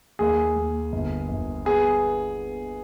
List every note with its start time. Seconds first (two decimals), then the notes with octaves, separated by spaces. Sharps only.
0.19 D#2 G#4
0.56 D#2
0.92 G1
1.29 G1
1.65 B3 G#4